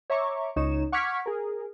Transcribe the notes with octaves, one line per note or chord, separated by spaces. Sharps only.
C#5 E5 A#5 C#6 D6
C#2 D#4 C#5 E7
F#5 C#6 D6 F6 G#6 B6
G#4 A#4